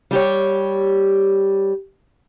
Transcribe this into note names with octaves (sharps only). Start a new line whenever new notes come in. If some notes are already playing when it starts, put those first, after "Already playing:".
G3 G4 C#5